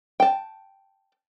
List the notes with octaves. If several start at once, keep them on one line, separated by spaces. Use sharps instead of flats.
G5 A5